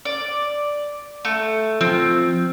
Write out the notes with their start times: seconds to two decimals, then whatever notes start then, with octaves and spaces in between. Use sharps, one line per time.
0.05 D5
1.25 A3
1.81 F3 C4